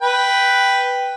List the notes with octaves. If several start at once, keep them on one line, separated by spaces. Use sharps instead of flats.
B4 G5